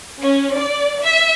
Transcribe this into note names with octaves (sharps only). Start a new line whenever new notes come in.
C#4
D5
E5